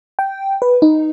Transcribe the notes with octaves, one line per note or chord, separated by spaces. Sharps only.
G5
B4
D#4